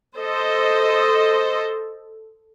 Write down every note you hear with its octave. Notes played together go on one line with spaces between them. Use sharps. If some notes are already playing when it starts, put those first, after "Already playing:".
A4 C5 D#5